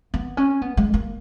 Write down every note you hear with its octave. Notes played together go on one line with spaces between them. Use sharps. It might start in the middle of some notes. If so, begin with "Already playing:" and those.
B3
C#4
B3
G#3
A#3